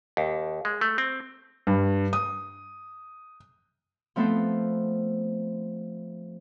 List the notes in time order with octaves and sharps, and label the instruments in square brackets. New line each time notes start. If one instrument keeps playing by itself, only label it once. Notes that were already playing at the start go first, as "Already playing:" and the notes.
[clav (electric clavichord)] D#2
G#3
A3
C4
[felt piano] G2
D#6
[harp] F3 A3 B3 C4 A4 C5